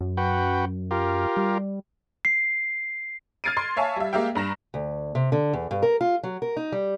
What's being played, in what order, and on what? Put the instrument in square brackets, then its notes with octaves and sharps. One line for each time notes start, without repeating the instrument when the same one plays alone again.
[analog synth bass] F#2
[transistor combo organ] F#4 B4 G5
F4 G4 A#4
[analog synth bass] G3
[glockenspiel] C7
[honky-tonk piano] F6 G#6 A6 C7 D7 D#7
C6 C7
C#5 E5 F5 G#5 A5 C#6
G3 E5
G#3 A#3 G4 E5 F5 G5
G2 A#5 A#6 E7
[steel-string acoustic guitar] D2
C3
D3
E2
G2
A#4
F4
F#3
A#4
D#4
G3